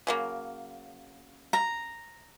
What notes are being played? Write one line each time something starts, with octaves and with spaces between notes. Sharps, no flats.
C#3 F#3 A#3
A#5